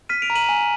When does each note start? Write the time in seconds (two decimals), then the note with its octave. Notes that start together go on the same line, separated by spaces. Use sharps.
0.09 F6 B6 D#7
0.22 D7 F7
0.30 A#5
0.35 D#7 F#7
0.49 G#5